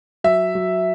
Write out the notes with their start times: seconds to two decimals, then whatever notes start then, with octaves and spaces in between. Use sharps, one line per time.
0.24 F#3 E5
0.55 F#3